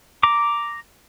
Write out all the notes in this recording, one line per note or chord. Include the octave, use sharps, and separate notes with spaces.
A#5 D6